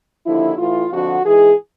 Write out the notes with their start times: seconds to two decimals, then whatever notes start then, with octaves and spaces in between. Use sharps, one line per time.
0.25 D#2 D3 F3 E4
0.58 A2 E3 F4
0.91 F2 D3 F3 F#4
1.24 G#2 E3 G#4